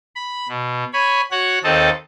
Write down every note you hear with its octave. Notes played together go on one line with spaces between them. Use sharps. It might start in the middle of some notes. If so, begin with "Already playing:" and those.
B5
B2
C#5 G#5 B5
F#4 C#5 F#5 F#6
D#2 C4 A4 D#5 A5